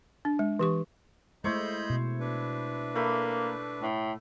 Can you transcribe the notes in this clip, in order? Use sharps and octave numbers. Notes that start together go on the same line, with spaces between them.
D4
G#3
E3 G4 C#6
G#3 A3 E4 C5 C#5 D#5 B5 G6
B2
D4 B4
A3 A#3 B5
A2